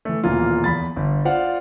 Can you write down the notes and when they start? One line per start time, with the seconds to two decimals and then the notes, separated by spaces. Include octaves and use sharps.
0.05 E3 A3
0.24 D#1 B2 E3 A#3 F4
0.64 E2 B5 A6
0.96 G1
1.25 F4 C5 D5 F5 F#5